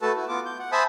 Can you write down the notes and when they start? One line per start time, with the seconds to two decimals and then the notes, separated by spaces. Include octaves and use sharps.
0.02 A3 F#4 A4 B4 A5
0.16 E4 F#4
0.28 B3 F4 D6
0.46 G6
0.59 F#5
0.72 C5 E5 G#5 A5 B5 D#6